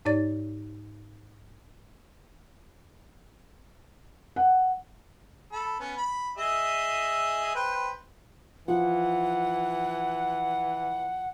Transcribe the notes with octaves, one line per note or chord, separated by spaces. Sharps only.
G#2 D#4 C#5 D5 A6
F#5
A4 B5
B3 C#4
B5
G#4 D#5 E5
B4 C5 G5
E3 F3 F#5